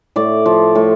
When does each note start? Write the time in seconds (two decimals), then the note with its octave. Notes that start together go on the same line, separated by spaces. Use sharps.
0.16 A2 D5
0.46 F3
0.75 A2